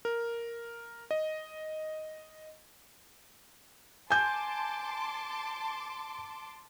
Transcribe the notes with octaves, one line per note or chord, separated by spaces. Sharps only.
A#4
D#5
G#5 A5 C6 D6 G6